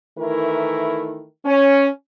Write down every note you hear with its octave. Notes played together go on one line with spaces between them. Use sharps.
D#3 E3 A3 E4 A#4
C#4